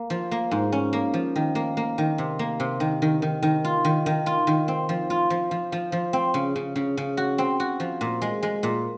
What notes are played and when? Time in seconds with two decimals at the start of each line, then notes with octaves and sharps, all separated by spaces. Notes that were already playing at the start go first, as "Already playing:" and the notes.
Already playing: A#3
0.10 F3
0.31 A#3
0.51 G#2
0.72 C#4
0.93 A#3
1.14 F3
1.36 D#3
1.55 A#3
1.77 A#3
1.98 D#3
2.18 C3
2.39 A#3
2.60 C3
2.80 D#3
3.02 D#3
3.22 D#3
3.42 D#3
3.65 F4
3.85 D#3
4.06 D#3
4.26 F4
4.47 D#3
4.68 C4
4.89 F3
5.10 F4
5.30 F3
5.51 F3
5.72 F3
5.92 F3
6.13 C4
6.34 C#3
6.56 C#3
6.76 C#3
6.97 C#3
7.17 F#4
7.38 C4
7.60 F#4
7.80 F3
8.01 A#2
8.22 G#3
8.43 G#3
8.63 A#2